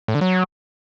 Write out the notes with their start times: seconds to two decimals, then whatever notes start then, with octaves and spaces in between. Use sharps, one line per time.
0.08 A2
0.15 D3
0.21 F#3